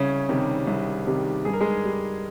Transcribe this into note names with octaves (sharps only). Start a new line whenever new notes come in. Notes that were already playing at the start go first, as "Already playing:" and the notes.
Already playing: C2 C#3 C#4
C3 D#3 G3
C2
C3 D#3 G3
G2 G#4
A#4
G#3 G#4
G3